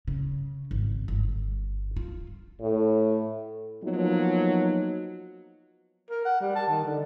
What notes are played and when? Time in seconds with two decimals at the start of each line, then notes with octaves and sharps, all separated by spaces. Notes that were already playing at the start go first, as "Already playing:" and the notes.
0.08 C#3
0.71 G#1
1.08 G1
1.97 F4
2.61 A2
3.84 F3 F#3 A#3 B3 D#4
6.10 A#4
6.25 F#5
6.41 G3
6.55 A5
6.69 D#3
6.84 D3